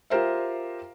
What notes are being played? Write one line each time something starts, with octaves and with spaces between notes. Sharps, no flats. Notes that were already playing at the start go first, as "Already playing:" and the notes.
F4 G4 A#4 C5 E5